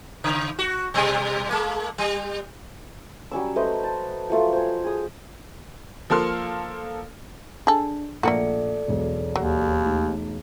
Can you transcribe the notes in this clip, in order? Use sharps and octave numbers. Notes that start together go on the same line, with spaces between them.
C#3
F#4
B2 G3
G#3 A#3
G3
F#3 G3 C#4 E6
A3 B4 C5 D#5
A5
F3 F#3 A3 F4
C5 G#5
G#4 D#6
F3 A#3 A4 C6 F6
D4 G#4 A4
A#1 A3 A#3 F#4 A4 D5 C#7
E1 B1
D#2 F#3
A3 D#4